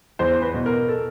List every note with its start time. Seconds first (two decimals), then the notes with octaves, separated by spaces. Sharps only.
0.19 E2 C5
0.42 B4
0.54 B2
0.66 A#4
0.88 A4